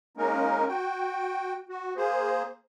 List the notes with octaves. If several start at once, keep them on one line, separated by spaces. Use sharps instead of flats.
G#3 A#3 C#4 D#4 A#4
F#4 G5
F#4
A#3 G#4 C5